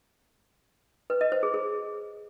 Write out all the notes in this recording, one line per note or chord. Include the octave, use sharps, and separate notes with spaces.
B4
D#5
C5
G#4
G#4